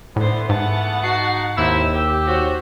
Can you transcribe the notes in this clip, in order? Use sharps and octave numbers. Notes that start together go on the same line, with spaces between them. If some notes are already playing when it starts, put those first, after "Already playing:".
A2 D3 E3 A3 B3 C5
G#2 F#5 A5
D#4 F#4 C7
D#2 C4 E4 E6
G4
F#4 C5 C#5